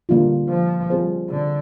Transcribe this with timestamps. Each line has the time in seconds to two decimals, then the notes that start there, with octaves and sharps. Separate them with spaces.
0.09 D3 G3 A#3 D4 F4
0.49 F3
0.90 G3 C4 F4 G#4 C5
1.30 D3